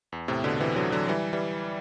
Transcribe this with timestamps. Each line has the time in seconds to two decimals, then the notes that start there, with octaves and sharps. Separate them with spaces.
0.12 E2
0.28 A2 C3
0.44 B2 D3
0.60 C3 E3
0.76 D3 F#3
0.92 D3 F#3
1.09 E3 G3
1.33 E3 G3